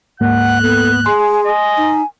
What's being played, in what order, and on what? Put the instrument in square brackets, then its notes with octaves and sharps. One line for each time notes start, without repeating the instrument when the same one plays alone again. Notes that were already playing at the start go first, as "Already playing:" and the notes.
[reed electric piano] D2 G#2 A#3 [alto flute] F#5 [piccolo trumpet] F#6
[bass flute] B3 [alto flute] A4
[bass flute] G#4 [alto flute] G#5 [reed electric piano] C6
[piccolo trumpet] D#5 [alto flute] G#5
[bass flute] D#4